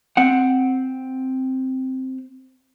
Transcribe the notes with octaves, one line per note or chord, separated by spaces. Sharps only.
C4 F#5